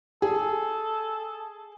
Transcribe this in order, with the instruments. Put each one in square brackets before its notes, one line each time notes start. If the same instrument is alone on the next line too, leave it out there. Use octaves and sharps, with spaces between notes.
[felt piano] G#4 [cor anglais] A4